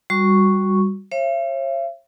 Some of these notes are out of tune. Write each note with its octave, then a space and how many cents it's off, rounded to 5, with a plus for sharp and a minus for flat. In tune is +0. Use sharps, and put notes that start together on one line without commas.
G3 +0 F#4 -10 C#6 +0
C#5 -45 E5 +45